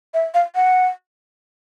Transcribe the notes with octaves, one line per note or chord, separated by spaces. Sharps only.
E5
F5
F#5